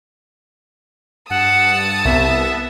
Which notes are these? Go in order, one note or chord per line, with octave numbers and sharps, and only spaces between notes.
G2 F#5 A5 D#6 E6
C2 B3 E5